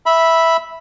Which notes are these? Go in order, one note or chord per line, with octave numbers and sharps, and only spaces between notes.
E5 B5